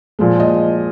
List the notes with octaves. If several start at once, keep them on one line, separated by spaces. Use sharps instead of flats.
A#2 F3 G#3
D#5